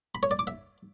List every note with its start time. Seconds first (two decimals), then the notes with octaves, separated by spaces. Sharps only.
0.15 B5
0.23 C#5
0.31 D5
0.39 D6
0.47 E5